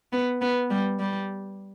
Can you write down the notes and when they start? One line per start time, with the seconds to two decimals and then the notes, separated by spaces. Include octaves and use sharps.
0.13 B3
0.42 B3
0.70 G3
0.99 G3